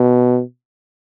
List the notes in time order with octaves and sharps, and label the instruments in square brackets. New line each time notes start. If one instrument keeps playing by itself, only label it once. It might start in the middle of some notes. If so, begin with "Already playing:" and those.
Already playing: [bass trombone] B2